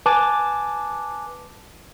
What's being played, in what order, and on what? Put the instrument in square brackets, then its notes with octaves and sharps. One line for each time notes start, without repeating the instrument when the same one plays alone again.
[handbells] B4 G#5 A5 D6